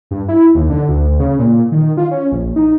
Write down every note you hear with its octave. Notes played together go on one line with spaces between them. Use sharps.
G2
E4
D#2
D3
D2
C#3
A#2
D#3
F4
C#4
A#1
D#4